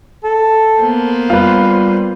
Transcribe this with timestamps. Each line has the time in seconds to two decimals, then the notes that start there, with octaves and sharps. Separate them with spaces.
0.24 A4
0.81 A#3 B3 C5
1.30 G3 F4 B4